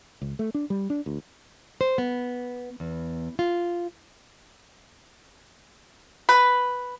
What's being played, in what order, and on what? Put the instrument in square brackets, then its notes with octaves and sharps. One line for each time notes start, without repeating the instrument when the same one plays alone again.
[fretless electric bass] C#2
A3
D4
G3
D4
D2
[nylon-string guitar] C5
B3
E2
F4
[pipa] B4